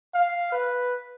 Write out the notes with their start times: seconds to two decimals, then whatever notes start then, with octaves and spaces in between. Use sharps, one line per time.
0.14 F5
0.52 B4